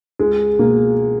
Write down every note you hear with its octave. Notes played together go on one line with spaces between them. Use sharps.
C#2 G#3
B2 A#3